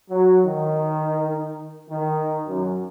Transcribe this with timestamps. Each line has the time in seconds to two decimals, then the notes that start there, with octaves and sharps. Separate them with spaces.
0.10 F#3
0.45 D#3
1.90 D#3
2.47 F#2